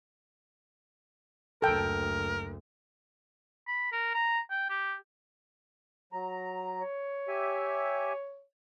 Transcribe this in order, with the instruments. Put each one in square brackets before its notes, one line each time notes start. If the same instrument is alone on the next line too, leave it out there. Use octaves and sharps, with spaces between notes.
[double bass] F#1 D2 [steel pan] A4 G5 [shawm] A#4
[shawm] B5
A#4
A#5
G5
G4
[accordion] F#3 A#5
[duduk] C#5
[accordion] G4 E5 G#5